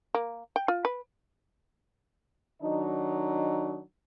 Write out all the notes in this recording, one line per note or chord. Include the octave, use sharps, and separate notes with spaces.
A#3
G5
F4
B4
D#3 F#3 D4 D#4